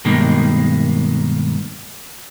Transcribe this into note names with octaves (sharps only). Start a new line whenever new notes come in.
G2 B2 D#3 G#3 A#3